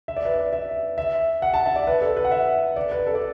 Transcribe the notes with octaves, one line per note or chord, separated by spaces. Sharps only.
E5
D5
B4
D5
E5
E5
F#5
A5
E5
D5
B4
A4
B4
F#5
E5
D5
B4
A4
D5